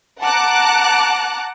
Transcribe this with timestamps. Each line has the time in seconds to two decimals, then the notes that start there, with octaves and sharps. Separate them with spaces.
0.22 F#5 A5 A#5 D6 F#6